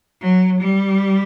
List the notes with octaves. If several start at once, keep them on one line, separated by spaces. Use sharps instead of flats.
F#3
G3